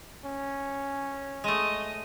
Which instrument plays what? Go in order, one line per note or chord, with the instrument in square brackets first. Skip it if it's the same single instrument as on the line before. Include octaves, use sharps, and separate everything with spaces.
[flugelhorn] C#4
[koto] G#3 A3 [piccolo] D#5